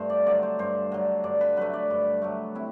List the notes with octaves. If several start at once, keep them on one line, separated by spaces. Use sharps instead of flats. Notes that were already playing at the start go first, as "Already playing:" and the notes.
Already playing: G2 A3 C5
D5
D3 F#3 D5
C5
G2 C5
D3 F#3
G2 D5
B4
F#3 A3 B4
D5
G2
F#3 A3
C3 E4